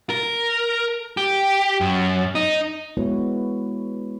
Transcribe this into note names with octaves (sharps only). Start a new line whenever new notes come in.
A#4
G4
F#2
D#4
G#3 B3 E4 F#4 B4 C#5